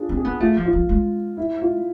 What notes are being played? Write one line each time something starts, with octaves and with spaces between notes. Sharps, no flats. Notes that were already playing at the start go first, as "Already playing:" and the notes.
Already playing: D4 F4 G#4
C4
G#4
B3
A3 F4
F3
F4
F3
G#3
E4
F4